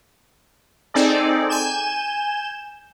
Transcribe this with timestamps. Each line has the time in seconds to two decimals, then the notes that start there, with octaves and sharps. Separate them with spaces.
0.94 C4 D#4 G#4 A4 D5
1.49 G#5 G6 E7